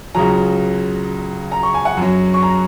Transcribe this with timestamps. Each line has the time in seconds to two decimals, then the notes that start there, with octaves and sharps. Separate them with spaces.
0.14 C#2 C#3 F#3 A#5
1.52 A#5
1.63 C#6
1.74 G#5
1.85 F#5
1.97 F#2 F#3
2.34 C#6
2.42 A#5